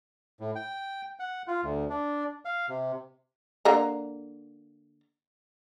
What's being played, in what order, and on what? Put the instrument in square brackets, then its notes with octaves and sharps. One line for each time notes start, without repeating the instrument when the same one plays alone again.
[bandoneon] A2
G5
F#5
F4
D2
D4
F5
C3
[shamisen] D3 A#3 A#5